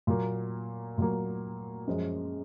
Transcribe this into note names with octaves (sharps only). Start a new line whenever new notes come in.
A#2 F#3 A#3
A#2 F#3 A#3
F#2 F3 G#3